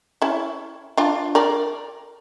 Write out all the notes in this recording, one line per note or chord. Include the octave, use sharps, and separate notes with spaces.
C#4 E4
D4 F4
A#4 D5